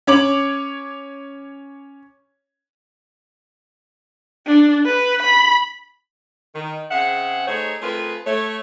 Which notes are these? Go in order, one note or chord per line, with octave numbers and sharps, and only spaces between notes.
C#4 C#5 D6 F#7
D4
B4
B5
D#3
C#3 C4 G#4 E5 F#5
A3 D#4 G#4 C5 C#5
A3 C4 F4 G#4 A#4 B4
A3 C#5